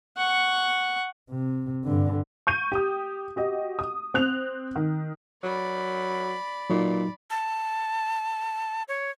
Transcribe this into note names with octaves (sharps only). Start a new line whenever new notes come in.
F#5 C#6
C3
G2 D3
C#6 G6 D#7
G4 D#6
F#4 G4 D#5
D#6
C4 F#6 F7
D#3
F#3 D5 B5
A#2 F#3 D#4
A5
C#5